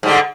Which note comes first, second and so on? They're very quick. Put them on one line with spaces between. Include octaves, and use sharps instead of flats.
G#2 G3 D3